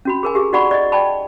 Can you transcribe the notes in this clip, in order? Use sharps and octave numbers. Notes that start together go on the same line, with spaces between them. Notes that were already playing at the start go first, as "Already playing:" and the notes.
C#4 F#4 B5
G#4 A#4 G#5
G4 G#4
D#4 F#4 D5 F#5 B5 C#6
D5 D#5
D5 G5 A5 B5